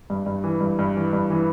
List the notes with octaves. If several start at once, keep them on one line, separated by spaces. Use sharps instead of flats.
G2
G2
E3
G2
G2
E3
G2
E3